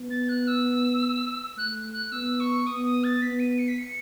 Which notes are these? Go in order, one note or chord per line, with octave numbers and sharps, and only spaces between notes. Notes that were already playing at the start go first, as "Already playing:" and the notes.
Already playing: B3
A6
F#6
E6
A3 F#6
F#6
B3 E6
C#6
B3 D#6
D#6
A6
B3 B6
D#7
C#7
B6
C#7